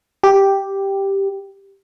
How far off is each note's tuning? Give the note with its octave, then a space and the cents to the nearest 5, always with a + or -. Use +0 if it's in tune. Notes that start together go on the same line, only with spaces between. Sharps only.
G4 +0